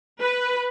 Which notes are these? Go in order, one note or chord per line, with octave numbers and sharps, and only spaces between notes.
B4